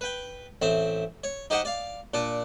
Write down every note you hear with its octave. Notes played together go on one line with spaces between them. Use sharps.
B4 G5
A1 C4 E5
C#5
D#4 G4 C5 D#5 F#5 G5
D5 F5
A#2 D4 D5